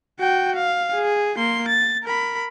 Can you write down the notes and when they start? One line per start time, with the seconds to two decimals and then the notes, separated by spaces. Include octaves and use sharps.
0.20 F#4 G5
0.56 F5
0.95 G#4
1.38 A#3 C6
1.68 A6
2.03 A#4 B5